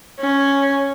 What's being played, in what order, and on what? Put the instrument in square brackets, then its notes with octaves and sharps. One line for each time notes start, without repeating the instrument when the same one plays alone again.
[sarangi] C#4